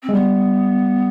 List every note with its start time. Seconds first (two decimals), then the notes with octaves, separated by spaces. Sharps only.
0.03 C4
0.09 G#3
0.13 G3 B3